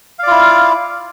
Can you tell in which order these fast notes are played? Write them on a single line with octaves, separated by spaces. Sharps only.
F5 D5 F4 E4